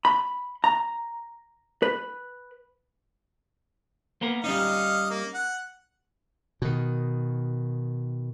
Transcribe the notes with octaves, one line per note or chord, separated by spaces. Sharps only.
B5
A#5
B4
A#3 B3 A#4
G3 C#4 D#4 D#5 F5
A#3
F#5
B2 D#3